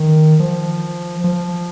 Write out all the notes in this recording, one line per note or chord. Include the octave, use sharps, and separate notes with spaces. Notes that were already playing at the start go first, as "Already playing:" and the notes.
Already playing: D#3
F3
F3